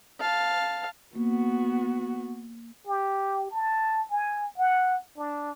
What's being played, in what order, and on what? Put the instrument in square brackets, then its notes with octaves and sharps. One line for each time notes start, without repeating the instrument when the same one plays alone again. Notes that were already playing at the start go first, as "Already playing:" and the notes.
[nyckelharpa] F5 A5
[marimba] A#3 [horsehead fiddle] B3 F#4
[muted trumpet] G4
A5
G#5
F#5
D4